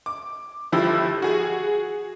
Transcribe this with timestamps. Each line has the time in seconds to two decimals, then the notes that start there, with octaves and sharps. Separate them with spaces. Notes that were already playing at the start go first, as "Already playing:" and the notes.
0.06 D6
0.72 G1 F3 E4 G4 A4
1.22 F#4 G#4